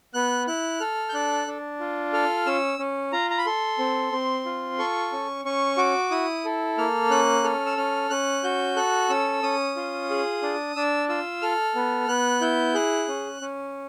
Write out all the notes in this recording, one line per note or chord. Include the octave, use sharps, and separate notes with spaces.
B3 F#6
E4 F#6
A4 F6
G6
D4 F#6
D4
F4
A4 F6
C#4 E6
C#4
F4 A#5
A#5
B5
A4 C6
C4
C4
F4
A4 C#6
C#4
C#4 C#6
F#4 D6
E4 D#6
A4
A#3 F6
C#4 F#6
A4 F6
E6
C#4 F6
C#4 F#6
F#4 G6
A4 F#6
C#4 E6
C#4 D#6
F4
G#4
D4
D4 E6
F4 E6
A4 F6
B3
B3 F#6
E4 G6
G#4 F#6
C#4
C#4